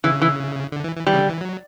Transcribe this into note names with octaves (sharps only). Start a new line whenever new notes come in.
C#3 E3
E3
D3
E3
E3
E3 G3
C#3
D3
E3
F#3